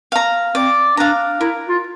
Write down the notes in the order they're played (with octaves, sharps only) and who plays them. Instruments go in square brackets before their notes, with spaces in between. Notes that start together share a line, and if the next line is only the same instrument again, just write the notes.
[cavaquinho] F5 A#5
[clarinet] C4 [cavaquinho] D5
[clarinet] D4 [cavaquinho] F5 A#5
[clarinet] E4 [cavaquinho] A#4
[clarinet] F4